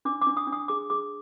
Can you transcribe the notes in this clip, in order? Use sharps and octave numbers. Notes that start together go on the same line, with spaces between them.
D4 D6
D6
D4
D#6
D4
D#6
G#4 D6
G#4 D6